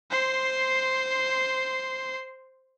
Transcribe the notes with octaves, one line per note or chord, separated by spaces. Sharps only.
C5 C6